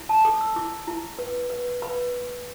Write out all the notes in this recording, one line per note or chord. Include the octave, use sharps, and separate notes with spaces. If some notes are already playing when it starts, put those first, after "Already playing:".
Already playing: E4
A5
A4 D6
E6
E4 D6
E4
B4
B4
B4 B5